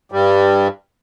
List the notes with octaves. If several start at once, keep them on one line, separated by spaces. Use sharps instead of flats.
G2 G3